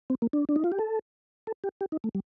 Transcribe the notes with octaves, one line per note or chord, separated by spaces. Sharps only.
C4
A#3
D4
D4
D#4
F4
G4
A4
A4
G4
G4
D#4
A3
G3